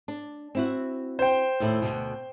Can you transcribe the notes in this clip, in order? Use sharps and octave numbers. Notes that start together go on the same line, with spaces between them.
D4
C4 E4 F#4
C5 G5
D#2 A2 E4
D2 B2